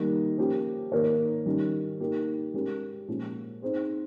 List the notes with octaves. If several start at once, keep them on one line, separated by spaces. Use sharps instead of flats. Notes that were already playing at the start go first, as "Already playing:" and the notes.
Already playing: D#3 G3 A#3 D#4
F3 A#3 C#4 G4
D#3 A#3 D#4 A#4 C#5
D#3 G3 C#4
A#3 D#4 G4 A#4
G#3 C#4 G4 A#4
A#2 F3 G#3 C#4
C4 D#4 G#4 C5